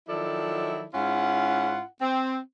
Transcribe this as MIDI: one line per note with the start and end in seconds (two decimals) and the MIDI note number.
0.08 0.84 51
0.08 0.84 53
0.08 0.84 54
0.08 0.84 64
0.08 0.84 69
0.08 0.84 74
0.94 1.82 44
0.94 1.82 61
0.94 1.82 64
0.94 1.82 65
0.94 1.82 78
2.01 2.38 60